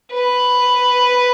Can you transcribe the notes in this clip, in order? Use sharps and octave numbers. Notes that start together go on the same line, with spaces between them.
B4